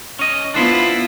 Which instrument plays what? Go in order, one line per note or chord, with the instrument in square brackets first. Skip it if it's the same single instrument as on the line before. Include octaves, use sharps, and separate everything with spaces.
[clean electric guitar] C#4 D#5
[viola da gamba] B3 E4 F4 [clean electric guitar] D4 C5